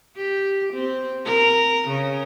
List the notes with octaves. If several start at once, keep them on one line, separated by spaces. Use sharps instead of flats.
G4
C4
A#4
C#3